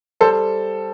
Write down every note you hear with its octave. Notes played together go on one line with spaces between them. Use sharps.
G3 A4 C5